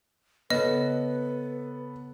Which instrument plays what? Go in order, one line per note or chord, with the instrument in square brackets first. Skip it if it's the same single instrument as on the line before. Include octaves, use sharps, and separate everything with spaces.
[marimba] C#3 [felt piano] B3 A4 [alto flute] B4 [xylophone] D#5